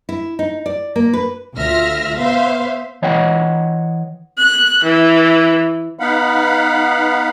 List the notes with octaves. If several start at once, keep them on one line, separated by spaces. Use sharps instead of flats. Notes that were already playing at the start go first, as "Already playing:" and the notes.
E4
D#4
D5
A#3
B4
D2 F4 E5 F6 A#6
B3 C5 E5 F5
E3 C#5 D#5 F#5 G5
F#6
E3
B3 D#4 F5 F#5 B5